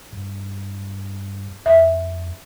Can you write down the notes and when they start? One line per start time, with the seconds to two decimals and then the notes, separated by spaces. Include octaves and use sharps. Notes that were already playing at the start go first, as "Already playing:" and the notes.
0.13 G2
1.66 F2 E5